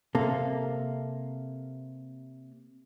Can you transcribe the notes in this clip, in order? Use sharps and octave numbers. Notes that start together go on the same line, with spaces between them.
C3 A#3 A4